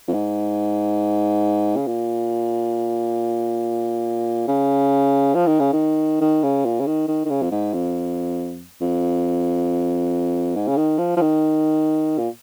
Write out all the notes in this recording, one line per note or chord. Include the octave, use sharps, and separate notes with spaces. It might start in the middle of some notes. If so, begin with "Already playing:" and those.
F2
G#2
C#3
A#2
C#3
F3
D#3
C#3
D#3
D#3
C#3
A#2
C#3
D#3
D#3
D#3
C#3
F2
G#2
F2
F2
G#2
C#3
D#3
F3
F3
D#3
A#2